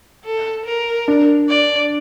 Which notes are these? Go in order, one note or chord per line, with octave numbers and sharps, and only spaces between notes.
A4
A#4
D4
D5